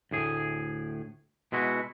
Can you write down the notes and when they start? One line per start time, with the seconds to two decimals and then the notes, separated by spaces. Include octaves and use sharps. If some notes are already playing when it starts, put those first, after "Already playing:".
0.11 D2 A2 G#4
1.52 B2 G#3 E4 F#4